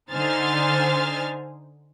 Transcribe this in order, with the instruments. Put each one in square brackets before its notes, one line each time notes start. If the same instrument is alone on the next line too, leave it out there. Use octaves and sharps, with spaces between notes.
[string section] D3 D#4 C5 G#5 F6 A6